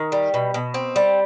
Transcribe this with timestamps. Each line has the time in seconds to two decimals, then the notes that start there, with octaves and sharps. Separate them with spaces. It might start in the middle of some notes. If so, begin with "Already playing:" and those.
Already playing: D#3
0.12 G3
0.34 B2
0.54 B2
0.74 C4
0.96 G3